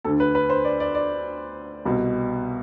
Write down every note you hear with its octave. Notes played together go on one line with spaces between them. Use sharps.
D2 D3 A4
B4
B4
C5
D5
D5
D5
C2 B2